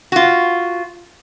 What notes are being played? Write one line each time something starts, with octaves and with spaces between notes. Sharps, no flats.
F4 F#4